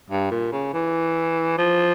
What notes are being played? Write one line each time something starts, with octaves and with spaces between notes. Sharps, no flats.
G2
A#2
C#3
E3
F3